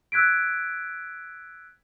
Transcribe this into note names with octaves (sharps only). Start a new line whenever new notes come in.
E6 F#6 G#6 B6 D7